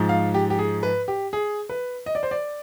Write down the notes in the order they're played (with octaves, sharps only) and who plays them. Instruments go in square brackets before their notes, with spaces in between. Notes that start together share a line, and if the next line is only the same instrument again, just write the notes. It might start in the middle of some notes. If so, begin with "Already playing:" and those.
Already playing: [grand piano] G#2 F3
F5
G4
G4
G#4
B4
G4
G#4
B4
D#5
D5
C5
D5